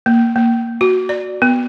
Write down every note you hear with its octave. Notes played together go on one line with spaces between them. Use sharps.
A#3
A#3
F#4
D5
B3